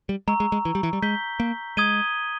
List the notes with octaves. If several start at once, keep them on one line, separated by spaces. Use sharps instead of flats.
G3
G#3 A#5 C#6 E6
G#3
G#3
E3
G3
E3
G3
G#3 G6 B6 G7
A#3
G#3 D#6 G#6 D#7 G7